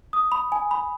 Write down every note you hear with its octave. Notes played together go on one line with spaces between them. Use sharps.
D#6
B5
G#5
B5